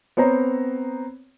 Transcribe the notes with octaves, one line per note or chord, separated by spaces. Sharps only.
B3 C4 C5 C#5 A#5